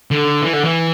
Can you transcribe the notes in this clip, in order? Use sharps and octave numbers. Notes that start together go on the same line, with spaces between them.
D3
E3
D3
E3